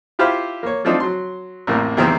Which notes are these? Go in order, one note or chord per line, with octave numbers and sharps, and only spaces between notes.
E4 F4 G4 C5 F5 B5
A#3 C#5
F3 A3 C4 D4 D#4 F4
F#3 C6
A1 F2 A2 A#3
E2 C3 D#3 E3 A#3 C4